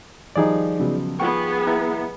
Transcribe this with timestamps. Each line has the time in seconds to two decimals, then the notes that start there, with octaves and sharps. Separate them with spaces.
0.36 D#3 F3 G3 D#4 G#4 D5
0.80 C#3 F#3 B3
1.20 B3 F4 G#4 F#5 G5 C#6
1.67 E4 E5 A#5